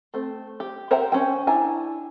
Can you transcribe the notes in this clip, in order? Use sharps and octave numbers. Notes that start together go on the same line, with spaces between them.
A3 C4
G4
A#4 C5 E5 F#5 G5
C#4 C5 G5
D4 E4 G#5 A#5